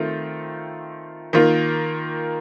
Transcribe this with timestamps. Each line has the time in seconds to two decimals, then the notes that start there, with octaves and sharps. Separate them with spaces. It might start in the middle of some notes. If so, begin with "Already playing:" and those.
Already playing: D#3 A3 C4 F4
1.33 D#3 A#3 F4